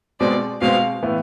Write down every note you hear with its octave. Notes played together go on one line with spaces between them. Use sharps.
B2 G#3 C4 D5
B2 G#3 C4 F5
A2 E3 B3